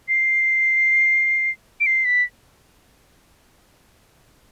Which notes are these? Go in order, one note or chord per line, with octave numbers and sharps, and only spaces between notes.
C7
D7
C7
B6